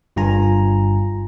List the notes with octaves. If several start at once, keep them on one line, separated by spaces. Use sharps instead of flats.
G1 G2 F4 G#5 A#5